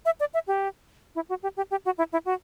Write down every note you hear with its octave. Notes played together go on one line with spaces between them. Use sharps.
E5
D5
E5
G4
E4
F#4
G4
G4
G4
F#4
E4
E4
F#4